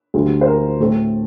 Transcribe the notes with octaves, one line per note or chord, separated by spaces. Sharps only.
D2 D3 G3
C5
A#4
A2 A3 C4